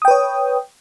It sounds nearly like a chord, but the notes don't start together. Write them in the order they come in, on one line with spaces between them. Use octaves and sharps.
D#6 G5 B4 C#5